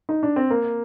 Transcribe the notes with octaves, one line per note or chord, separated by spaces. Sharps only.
D#4
D4
C4
A#3